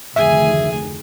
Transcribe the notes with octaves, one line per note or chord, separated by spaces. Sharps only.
F1 D2 D#3 G#4 E5 G#5